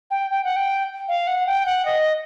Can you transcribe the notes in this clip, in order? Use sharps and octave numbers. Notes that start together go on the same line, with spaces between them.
G5
G5
F#5
G5
F5
F#5
G5
F#5
D#5